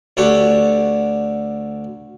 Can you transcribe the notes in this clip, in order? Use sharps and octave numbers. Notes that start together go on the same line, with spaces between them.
D2 D3 G4 C#5 F#5